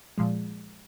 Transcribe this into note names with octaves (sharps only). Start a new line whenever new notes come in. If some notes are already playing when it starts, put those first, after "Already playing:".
A#2 F3 G#3